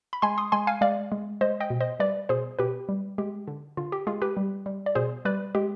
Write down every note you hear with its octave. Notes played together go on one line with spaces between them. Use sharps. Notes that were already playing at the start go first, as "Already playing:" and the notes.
B5
G#3 G#5 C6
C6 D#6
G#3 G#5 C6
F5 G#5
G#3 D5 F5
G#3
G#3 C5 D#5
D#5 G5
B2
C5 D#5
G3 B4 D5
B2 G#4 C5
B2 G4 B4
G3
G#3 G4
D3
D3 F4
G4
G#3 F4 G#4
G4 B4
G3
G3
D5
B2 G#4 C5
G3 B4 D5
G#3 G4